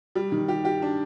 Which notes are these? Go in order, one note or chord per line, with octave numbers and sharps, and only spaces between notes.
G3
D#3
G4
G4
D4